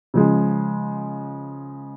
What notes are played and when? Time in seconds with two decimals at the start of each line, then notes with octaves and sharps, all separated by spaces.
0.14 C#3 F3 G#3